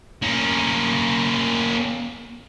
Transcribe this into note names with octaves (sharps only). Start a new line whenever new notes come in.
A#3 C#4